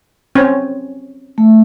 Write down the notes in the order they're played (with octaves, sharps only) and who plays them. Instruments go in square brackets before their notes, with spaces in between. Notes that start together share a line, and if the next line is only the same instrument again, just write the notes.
[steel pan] C4 C#4 C#5
[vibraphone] A3